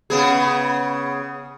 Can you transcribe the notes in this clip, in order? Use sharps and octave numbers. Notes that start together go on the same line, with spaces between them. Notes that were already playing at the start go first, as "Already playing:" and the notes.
C#3 B3 G#4